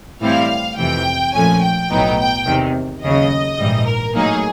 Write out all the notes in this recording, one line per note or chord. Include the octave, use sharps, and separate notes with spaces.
A2 E3 G3 C4 E4 F5
F2 C3 E3 G5
A#2 F3 A3 C#4 G#5
G5
B1 A2 F#3 B3 D#4
G5
E2 C3 D#3
D#2 C#3 F#3 D#5
A#1 G#2 E3 G3
A#4
A2 F#3 A#3 D#4 G#4